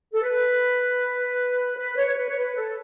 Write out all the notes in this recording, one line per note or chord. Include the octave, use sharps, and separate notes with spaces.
A4
B4
B4
C#5
C#5
B4
C#5
B4
A4